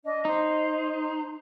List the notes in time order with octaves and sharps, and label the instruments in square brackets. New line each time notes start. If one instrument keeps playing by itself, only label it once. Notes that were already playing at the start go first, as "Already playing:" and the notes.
[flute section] D4 D#5
[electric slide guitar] D#4 [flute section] C5